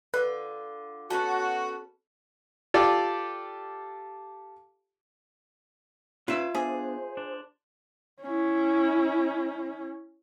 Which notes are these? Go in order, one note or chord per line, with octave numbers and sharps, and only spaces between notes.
D3 F4 B4
B3 C#4 F#4 A4
F4 G4 A4 D5
C#4 F4 B4 C5 E5
B3 D4 G#4 C5
D4
C#4 E4